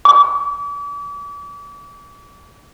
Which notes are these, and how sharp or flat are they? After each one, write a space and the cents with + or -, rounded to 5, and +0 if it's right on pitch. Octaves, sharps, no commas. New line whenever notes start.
D6 -40